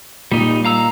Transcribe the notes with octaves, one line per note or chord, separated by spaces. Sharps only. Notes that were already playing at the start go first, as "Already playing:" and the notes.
A#2 G3 D#4
F5 A#5 E6